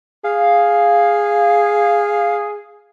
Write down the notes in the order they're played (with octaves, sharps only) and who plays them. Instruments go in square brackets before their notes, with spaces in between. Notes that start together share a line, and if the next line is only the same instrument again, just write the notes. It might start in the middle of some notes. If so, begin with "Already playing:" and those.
[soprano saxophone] G#4 [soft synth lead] F5